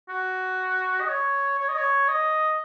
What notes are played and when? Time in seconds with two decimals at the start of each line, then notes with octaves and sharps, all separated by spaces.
0.09 F#4
1.00 D#5
1.09 C#5
1.59 C#5
1.68 D#5
1.78 C#5
2.08 D#5